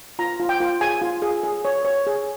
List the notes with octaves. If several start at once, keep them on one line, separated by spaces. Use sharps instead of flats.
F4 A#5
F4
G5
F4
G#4 G#5
F4
G#4
G#4
C#5
C#5
G#4